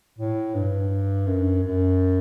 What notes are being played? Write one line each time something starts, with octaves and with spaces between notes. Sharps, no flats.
A2
G2
F#2
F#2